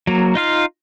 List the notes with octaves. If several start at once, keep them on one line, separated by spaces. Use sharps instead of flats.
F#3 A#3
D#4 F4 F5